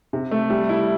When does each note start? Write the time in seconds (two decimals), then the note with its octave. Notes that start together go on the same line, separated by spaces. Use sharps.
0.13 C3
0.31 A3
0.50 G3
0.69 E4